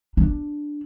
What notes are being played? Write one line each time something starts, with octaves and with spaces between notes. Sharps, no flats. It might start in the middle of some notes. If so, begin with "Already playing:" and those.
D4